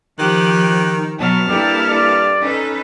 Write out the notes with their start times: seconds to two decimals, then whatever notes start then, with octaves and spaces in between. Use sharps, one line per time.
0.19 D#3 F3 G4 F#6
1.19 B2 F#3 B3 A5 F6
1.49 G2 A#3 E4 G4 A4 D5
1.88 D5
2.42 C#4 D#4 A4 B4